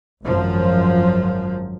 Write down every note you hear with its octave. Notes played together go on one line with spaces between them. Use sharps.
G#1 F#2 F3